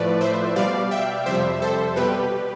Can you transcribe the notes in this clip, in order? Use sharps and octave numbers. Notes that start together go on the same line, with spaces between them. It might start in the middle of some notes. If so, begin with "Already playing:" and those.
Already playing: A2 F3 A3 B4 D5
C5 E5
B2 G3 D5 F5
E5 G5
F2 C3 G3 C5 E5
A4 C5
B2 G3 G4 B4